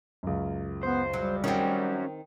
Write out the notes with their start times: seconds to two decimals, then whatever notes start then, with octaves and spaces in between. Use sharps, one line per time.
0.23 C#2 F#2
0.83 B3 C5
1.13 F#3 G3
1.44 D#3 C4 C#4 F#4